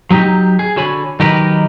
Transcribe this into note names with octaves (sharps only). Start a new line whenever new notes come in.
F#3 D#4 G4
G#4
D3 F#4 C#5 G#5 B5
D#3 F#3 D#4 G4 A#4 B4